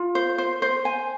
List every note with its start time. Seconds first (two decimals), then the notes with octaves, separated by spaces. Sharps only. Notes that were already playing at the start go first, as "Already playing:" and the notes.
Already playing: F4
0.15 C5
0.38 C5
0.62 C5
0.85 G#5